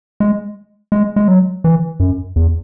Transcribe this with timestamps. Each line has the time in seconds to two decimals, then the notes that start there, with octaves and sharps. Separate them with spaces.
0.20 G#3
0.92 G#3
1.16 G#3
1.28 F#3
1.64 E3
2.00 F#2
2.36 E2